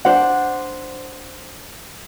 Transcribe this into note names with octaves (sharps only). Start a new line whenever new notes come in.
D4 C5 F#5